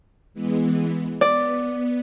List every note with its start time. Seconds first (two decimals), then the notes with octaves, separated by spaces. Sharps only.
0.34 E3 G#3 B3
1.21 B3 D5